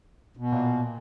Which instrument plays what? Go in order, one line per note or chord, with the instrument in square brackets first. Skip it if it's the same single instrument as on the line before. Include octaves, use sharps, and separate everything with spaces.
[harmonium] B2
[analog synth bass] A#2